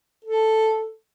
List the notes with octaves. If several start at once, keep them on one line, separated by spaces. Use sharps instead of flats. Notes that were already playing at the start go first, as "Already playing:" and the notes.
A4